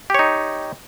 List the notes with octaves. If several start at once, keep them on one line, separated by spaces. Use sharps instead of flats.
D#4 G4 C#5